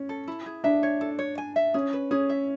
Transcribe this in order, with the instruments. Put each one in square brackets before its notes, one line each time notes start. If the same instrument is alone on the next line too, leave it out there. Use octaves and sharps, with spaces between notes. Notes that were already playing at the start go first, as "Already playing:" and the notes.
Already playing: [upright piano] C#4
[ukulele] A4
E4
G#4
[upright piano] D4 [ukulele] E5
[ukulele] C#5
A4
C#5
G#5
E5
[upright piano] C#4 [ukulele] G#4
[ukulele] B4
[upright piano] C#4 [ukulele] G#4
[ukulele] E5